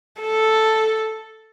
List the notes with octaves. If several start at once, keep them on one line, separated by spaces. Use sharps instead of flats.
A4